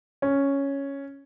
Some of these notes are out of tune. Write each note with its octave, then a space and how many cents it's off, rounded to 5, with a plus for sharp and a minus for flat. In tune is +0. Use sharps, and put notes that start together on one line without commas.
C#4 +0